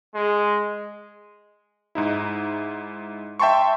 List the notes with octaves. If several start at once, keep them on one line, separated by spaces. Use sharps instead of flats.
G#3
G#2 D#4 E4
E5 G5 A5 C6 C#6